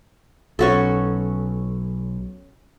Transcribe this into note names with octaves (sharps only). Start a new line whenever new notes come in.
B1 C#4 F#4 A4